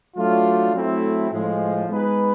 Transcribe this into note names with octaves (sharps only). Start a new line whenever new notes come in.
F#3 A3 D4 F4
F#3 A3 C4 E4
A2 F3 G#3
G#3 B3 D#4 G#4 B4